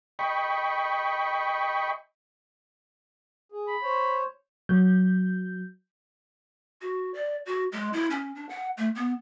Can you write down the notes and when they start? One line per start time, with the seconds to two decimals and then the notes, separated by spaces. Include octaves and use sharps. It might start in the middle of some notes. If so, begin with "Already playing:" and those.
0.19 D#5 G5 B5 C#6
3.52 G#4
3.68 B5
3.82 C5 C#5
4.69 F#3 G6
6.81 F#4
7.14 D5
7.46 F#4
7.72 G#3
7.93 E4
8.10 C#4
8.35 D4
8.49 F#5
8.77 A3
8.95 B3